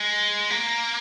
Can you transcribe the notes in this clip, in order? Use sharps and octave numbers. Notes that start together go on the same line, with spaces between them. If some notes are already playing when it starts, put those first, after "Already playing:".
Already playing: G#3
A#3